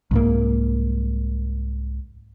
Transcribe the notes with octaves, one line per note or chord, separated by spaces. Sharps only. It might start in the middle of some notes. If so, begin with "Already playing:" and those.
C2 G#2 A#3